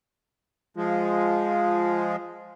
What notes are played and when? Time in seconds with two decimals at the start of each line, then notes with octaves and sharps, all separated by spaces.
0.77 F3 G#3 F4